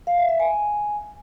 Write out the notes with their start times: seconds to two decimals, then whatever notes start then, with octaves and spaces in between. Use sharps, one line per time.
0.07 F5
0.18 E5
0.29 E5
0.40 G#5